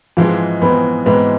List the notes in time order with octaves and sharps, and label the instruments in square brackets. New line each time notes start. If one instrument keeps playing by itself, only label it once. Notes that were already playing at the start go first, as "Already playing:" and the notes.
[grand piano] G#2 E3 G#3 C4 [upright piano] F3
[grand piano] G#2 E3 G#3 C4 [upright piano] B3
[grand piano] G#2 E3 G#3 C4 [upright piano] B3